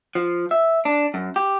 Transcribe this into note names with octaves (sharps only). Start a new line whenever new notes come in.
F3
E5
D4
F#2
G4